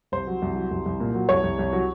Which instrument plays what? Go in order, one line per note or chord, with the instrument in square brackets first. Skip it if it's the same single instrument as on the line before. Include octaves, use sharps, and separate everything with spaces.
[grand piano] C2 C5
F#3
C2
F#3
C2
C2
A#2
F#3
C2 C#5
C2
C2
F#3